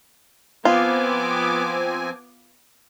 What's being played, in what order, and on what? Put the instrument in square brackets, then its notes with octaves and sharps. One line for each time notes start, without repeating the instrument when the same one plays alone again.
[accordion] F3 C4 G#5 [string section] B3 D6 [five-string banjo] F4